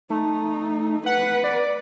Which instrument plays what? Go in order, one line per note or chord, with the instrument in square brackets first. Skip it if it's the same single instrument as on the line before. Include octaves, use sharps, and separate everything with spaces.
[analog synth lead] A3 [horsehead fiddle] D#4
[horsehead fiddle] B4 [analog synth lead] F#5
[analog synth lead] D5